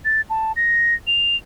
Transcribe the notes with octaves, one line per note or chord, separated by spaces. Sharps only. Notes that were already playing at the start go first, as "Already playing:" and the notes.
A6
A5
A#6
F7